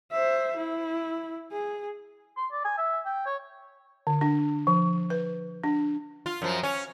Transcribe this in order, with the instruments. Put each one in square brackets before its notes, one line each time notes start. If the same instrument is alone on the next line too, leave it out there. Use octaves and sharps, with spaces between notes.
[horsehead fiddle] C5 E5
E4
G#4
[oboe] C6
D5
G#5
E5
G5
C#5
[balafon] D3
D4
F3
B4
D4
[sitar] F4
F#2 F3
C#4